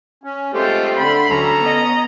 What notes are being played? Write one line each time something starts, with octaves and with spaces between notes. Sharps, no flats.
C#4
G#3 A3 C4 F4 G4 A4 C5
D3 B5 C6
D2 C#4 A4 A#5
B3 D#5